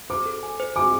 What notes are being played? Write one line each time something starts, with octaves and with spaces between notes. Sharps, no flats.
C5 D6
A4
G#5
C5
G#5 D6